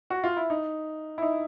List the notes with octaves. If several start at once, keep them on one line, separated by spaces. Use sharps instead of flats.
F#4
F4
E4
D#4
E4
D#4